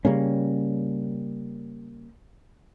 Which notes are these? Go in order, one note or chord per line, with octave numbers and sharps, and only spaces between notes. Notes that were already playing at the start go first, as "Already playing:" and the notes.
C#3 G3 A#3 C#4